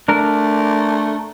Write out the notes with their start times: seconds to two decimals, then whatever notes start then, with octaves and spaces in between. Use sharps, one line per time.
0.08 A3 D4 A#4